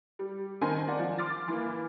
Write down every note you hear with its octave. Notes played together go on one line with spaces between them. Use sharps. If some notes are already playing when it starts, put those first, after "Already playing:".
G3
D#3 C4 G#5 A5 C6
D#3 D5 F#5
F3
C6 D6 F6 A6
E3 A#3